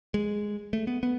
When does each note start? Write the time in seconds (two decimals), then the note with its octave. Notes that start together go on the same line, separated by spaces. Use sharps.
0.14 G#3
0.73 A3
0.87 B3
1.03 B3